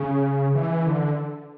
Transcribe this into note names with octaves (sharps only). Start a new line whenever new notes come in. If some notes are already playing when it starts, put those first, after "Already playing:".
Already playing: C#3
E3
D3